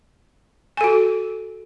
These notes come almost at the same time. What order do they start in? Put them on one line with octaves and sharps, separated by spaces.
G#5 A4 F#4